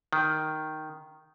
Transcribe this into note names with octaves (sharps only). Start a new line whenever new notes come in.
D#3